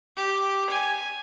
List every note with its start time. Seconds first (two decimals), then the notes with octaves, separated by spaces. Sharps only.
0.16 G4
0.70 G#5